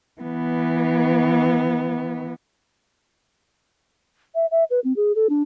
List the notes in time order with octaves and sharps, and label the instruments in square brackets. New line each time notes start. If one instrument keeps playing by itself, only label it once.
[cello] E3 B3
[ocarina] E5
E5
B4
C4
G#4
A4
D4